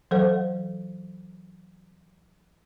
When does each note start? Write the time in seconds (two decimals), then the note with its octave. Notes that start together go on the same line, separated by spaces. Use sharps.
0.11 E3 F#3 A4 C5 F#5